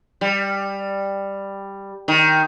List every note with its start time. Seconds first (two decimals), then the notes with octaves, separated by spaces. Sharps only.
0.21 G3
2.08 D#3